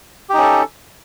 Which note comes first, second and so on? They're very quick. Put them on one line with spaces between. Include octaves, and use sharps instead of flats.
G4 D#4 C#4 A4